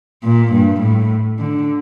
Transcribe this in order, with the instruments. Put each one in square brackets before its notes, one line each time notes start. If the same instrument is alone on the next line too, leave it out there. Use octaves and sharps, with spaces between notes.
[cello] A#2
G2
A2
D3